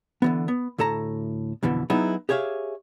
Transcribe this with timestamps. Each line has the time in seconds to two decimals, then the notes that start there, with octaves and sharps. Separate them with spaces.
0.22 D3 E3 B3
0.48 B3
0.78 D2 A2 A4 A5 A#5
1.63 F2 B2 D3 E3
1.90 F#3 B3 D#4 E4 G#4
2.29 G4 G#4 C#5 E5 F5